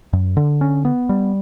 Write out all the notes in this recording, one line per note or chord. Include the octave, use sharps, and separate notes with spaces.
F#2
D3
C#4
B3
G3